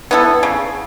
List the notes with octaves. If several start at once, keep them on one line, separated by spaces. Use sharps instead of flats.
B3 E4 A4
C#3